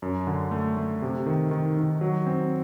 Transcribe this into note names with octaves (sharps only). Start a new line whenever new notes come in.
F#2
D3
A3
A3
C3
D#3
D#3
D#3
F#3
C4